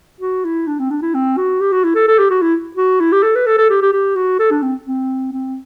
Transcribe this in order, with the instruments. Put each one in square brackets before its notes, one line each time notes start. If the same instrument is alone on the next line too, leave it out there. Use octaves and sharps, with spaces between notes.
[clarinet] F#4
E4
D4
C4
D4
E4
C4
F#4
G4
F#4
E4
A4
A4
G4
F#4
E4
F#4
E4
G4
A4
B4
A4
A4
G4
G4
G4
F#4
A4
D4
C4
C4
C4